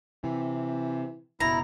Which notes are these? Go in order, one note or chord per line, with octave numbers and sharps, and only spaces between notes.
C3 E3
F#1 B2 E4 A#5